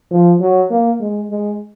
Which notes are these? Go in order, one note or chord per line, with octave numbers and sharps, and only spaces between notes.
F3
F#3
A#3
G#3
G#3